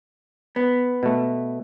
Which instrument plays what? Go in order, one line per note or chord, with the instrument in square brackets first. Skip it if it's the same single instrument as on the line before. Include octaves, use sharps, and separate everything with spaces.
[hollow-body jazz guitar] B3
[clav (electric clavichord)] B2 A3